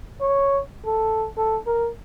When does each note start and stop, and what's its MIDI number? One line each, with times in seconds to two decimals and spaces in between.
0.21 0.60 73
0.86 1.27 69
1.38 1.58 69
1.67 1.89 70